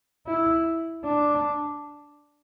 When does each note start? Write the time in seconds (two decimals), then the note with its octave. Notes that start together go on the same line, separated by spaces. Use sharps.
0.27 E4
1.05 D4